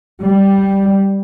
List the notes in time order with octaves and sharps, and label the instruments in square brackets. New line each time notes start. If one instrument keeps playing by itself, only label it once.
[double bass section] G3